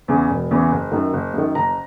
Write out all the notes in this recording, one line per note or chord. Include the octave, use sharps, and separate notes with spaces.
E2 C#3 E3
E1
E2 C#3 E3
F#1
F#2 D#3
F#1
F#2 D#3
F#1 A#5